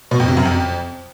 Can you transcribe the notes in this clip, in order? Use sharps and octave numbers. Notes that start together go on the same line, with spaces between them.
B2
F2
C3
F#2
F2